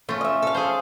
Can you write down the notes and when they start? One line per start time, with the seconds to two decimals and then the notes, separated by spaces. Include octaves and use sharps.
0.09 A3 C#4 F4
0.21 D#5 E5
0.42 A4 F5
0.54 G#4 C5